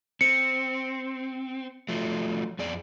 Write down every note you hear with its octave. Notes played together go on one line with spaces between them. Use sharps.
C4 C#7
F3 F#3 A3
F2 G#4 D5